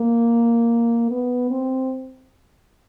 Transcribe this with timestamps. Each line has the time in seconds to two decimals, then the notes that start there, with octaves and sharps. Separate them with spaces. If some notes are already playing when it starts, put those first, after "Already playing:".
Already playing: A#3
1.11 B3
1.50 C4